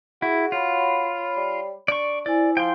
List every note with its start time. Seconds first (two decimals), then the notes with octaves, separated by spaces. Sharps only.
0.22 E4 F#4 G#4
0.52 F4 C#5 B5
1.37 G3
1.88 D4 D5 C#6
2.26 E4 C5 D5 G#5
2.57 F3 G5 C6